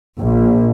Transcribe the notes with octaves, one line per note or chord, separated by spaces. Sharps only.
A#1